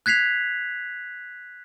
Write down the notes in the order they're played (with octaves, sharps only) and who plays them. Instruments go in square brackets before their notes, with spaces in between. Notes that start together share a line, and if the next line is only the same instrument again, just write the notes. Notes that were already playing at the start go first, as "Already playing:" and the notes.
[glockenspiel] F#6 G#6 B6 C7 F7